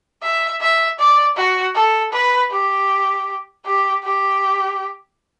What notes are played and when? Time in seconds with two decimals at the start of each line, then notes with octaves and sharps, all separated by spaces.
0.23 E5
0.61 E5
0.99 D5
1.36 F#4
1.75 A4
2.12 B4
2.51 G4
3.66 G4
4.04 G4